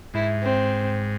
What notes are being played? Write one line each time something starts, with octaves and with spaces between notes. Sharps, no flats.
G#2 E4
C4